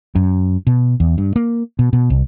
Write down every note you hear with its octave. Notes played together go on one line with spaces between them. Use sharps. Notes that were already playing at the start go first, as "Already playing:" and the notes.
F#2
B2
E2
G2
A#3
B2
B2
C2